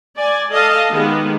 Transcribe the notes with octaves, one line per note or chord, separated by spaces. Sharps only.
D5 G#5
A4 D#5 F5 A5
D#3 G#3 B3 G4